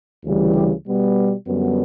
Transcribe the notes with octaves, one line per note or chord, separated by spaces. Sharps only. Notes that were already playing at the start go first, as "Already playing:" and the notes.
D2 C#3 E3 G3
G4
B2 G3 B3
F#2 D3 G3 B3